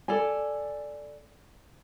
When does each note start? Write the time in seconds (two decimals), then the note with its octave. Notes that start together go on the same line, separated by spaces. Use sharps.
0.08 A4 D5 G#5